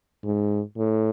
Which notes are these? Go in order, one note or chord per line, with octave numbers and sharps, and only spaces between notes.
G#2
A2